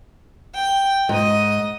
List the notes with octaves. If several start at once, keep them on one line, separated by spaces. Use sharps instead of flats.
G5
G#2 D#5 D#7